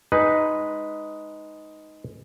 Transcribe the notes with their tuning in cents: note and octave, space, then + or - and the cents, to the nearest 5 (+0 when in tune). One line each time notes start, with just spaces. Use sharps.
G#3 +0 D#4 +0 B4 +0